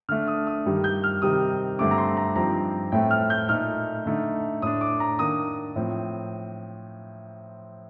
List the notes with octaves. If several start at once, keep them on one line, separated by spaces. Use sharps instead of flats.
D3 A3 D4 F6
D#6
D#6
G2 D#3 G3
G6
F6
C3 D#3 G3 C4 D#4 D#6
G2 D3 A3 C4 D6
A#5
C6
A#5
G2 F3 C4 D#4 A#5
A2 A3 C4 G5
F6
G6
A#2 A3 D#4 F6
D3 A3 D#4
A2 A3 D4 D#6
D6
A#5
D#3 A#3 D4 D#6
A2 F3 C4